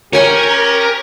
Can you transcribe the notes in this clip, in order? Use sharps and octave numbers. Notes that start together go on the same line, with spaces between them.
C#4 G4 A#4 C#5 G#5 C#6